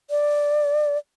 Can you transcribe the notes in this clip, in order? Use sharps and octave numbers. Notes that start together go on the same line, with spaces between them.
D5